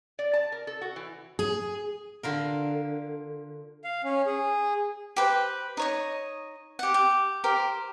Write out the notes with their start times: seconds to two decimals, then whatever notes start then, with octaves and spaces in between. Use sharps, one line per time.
0.19 D5
0.33 A5
0.52 A#4
0.67 A4
0.81 F#4
0.96 E3
1.39 G#4
2.23 D3 F4 A#4
3.84 F5
4.04 C#4
4.26 G#4
5.16 G4 B4 C5
5.77 D#4 C#5 D#5
6.79 G4 F#5
6.94 G4
7.44 G4 A#4 C5